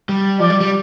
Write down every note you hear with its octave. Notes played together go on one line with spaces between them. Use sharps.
G3
F3 D5
G3
G3